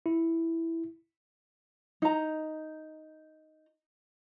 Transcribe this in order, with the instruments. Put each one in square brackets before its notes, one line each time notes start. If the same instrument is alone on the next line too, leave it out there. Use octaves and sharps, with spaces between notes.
[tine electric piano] E4
[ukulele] D#4 A#5